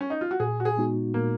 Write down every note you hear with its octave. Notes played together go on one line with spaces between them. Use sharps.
C#4
D#4
F4
F#4
A#2 G#4
F#4
G#4
G#3 B3 D#4 F#4
A#2 A#3